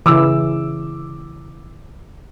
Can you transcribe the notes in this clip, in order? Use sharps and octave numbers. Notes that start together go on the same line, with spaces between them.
C#3 E3 D6 E6